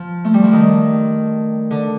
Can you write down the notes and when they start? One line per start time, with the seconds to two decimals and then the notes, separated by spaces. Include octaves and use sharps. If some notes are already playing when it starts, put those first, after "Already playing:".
Already playing: F3
0.24 A3
0.34 G3
0.43 F3
0.53 D#3
1.71 D3